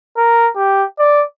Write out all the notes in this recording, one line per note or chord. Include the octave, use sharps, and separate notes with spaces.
A#4
G4
D5